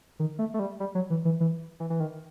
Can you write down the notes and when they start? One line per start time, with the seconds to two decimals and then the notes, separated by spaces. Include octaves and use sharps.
0.19 D#3
0.39 A3
0.54 A3
0.59 G3
0.80 G3
0.95 F#3
1.10 E3
1.25 E3
1.40 E3
1.80 E3
1.90 E3
2.00 D#3